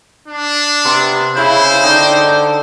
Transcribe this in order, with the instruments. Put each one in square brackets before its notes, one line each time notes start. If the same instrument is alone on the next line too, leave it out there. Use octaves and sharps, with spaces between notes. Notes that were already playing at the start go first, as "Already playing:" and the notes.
[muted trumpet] D4
[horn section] C3 B3
[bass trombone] C#3 [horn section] E4 [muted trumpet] C5
[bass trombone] D3 [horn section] D#4 G5